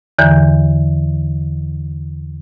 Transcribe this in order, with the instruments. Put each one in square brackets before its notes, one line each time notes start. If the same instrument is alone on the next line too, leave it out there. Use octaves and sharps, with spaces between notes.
[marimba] E2 D3 E3